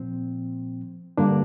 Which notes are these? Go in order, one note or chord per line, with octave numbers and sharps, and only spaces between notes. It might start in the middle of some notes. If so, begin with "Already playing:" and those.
Already playing: A#2 F3 C4
G2 D3 A#3 D4